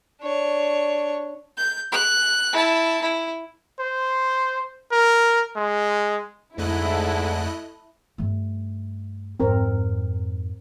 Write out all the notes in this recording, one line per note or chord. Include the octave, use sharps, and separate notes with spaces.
D4 C#5
G6
F#6
E4 A5
E4
C5
A#4
G#3
F2 G#2 D3 A3 E4 A4 D#5 F#6
G2 A3
F2 G#2 C4 A#4